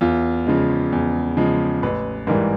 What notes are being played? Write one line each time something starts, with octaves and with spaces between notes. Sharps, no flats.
E2 F4
C#3 F3 G#3
E2
C#3 F3 G#3
A1 B4
G#2 E3 G3 A#4